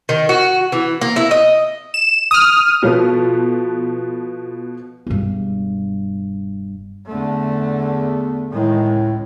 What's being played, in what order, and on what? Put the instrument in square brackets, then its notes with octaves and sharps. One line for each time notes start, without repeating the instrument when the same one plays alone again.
[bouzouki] D#3
F#4
E3
A#3
E4
D#5
[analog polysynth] E7
D#6 F6
[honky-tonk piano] B2 F3 B3 A4
[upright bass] E1 G2
[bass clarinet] E2 [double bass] D3 A3
[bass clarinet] A2 [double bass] D#3 G#3
[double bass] C#2